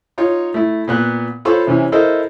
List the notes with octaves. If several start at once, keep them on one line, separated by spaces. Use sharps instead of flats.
D#4 F4 C#5
A3 E4
A#2 B3 F#6
F4 A4 C5 C#5 B5 C#6
C3 E3 C4 C#4
E4 A4 A#4 C5 D#5